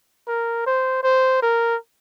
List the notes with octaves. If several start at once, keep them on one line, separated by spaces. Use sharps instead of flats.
A#4
C5
C5
A#4